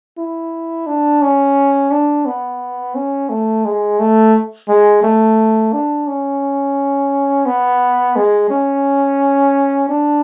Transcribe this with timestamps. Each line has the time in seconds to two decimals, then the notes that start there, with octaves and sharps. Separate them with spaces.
0.18 E4
0.87 D4
1.22 C#4
1.91 D4
2.26 B3
2.95 C#4
3.30 A3
3.65 G#3
3.99 A3
4.69 G#3
5.03 A3
5.73 D4
6.07 C#4
7.46 B3
8.16 G#3
8.50 C#4
9.89 D4